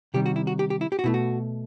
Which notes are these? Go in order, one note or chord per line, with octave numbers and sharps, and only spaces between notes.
C3 D#3 G3 G4
F#4
E4
F#4
G4
G4
E4
G4
F#4
B2 A3 E4
F#4